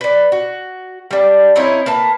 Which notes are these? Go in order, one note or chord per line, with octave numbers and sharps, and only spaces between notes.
B4 D5
F#4
G3 D4
C4 C#4 D#4 E4
A#3 B4 A5